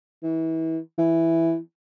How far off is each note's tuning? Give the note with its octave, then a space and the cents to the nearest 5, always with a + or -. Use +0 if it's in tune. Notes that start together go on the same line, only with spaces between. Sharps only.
E3 -30
E3 +0